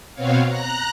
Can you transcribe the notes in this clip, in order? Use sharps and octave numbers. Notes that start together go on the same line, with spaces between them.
B2 B3 C4 C#5 F5
A#5 F#6